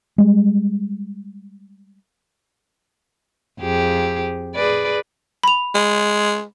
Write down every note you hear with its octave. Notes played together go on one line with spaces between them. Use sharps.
G3 G#3
F2 G4 G#4
G#4 B4 D5
B5 F7
G#3